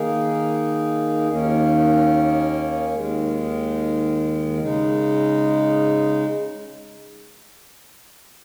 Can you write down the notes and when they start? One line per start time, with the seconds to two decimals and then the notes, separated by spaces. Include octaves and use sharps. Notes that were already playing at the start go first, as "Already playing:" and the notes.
Already playing: D#3 A#3 D#4 G#4
1.28 D#2 D#3 A#3 C#4
2.94 D#2 D#3 G#3
4.60 C#3 G#3 D#4